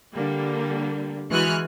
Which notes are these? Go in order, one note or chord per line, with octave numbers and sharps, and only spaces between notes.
D3 G3 A#3
E3 G#3 F#4 G#5 F6 F#6